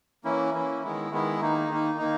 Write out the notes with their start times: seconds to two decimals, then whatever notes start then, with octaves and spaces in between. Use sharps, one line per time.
0.24 E3 A#3 C#4 E4
0.54 E3 A#3 C#4 E4
0.83 D#3 G#3 B3 E4
1.11 D#3 G#3 B3 E4
1.41 D#3 A#3 D#4
1.69 D#3 A#3 D#4
1.98 D#3 A#3 D#4